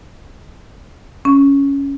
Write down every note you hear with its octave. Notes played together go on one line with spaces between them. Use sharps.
C#4